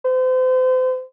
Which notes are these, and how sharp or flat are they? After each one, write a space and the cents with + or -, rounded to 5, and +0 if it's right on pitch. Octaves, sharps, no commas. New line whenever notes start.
C5 -35